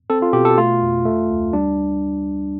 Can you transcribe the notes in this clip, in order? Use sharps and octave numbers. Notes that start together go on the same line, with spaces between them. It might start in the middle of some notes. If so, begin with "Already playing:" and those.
C4 A4
F4
B2 G4
A4
A3 F4
F2
A3
D2
G3 D4